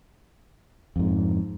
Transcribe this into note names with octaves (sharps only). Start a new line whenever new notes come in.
F2 G#2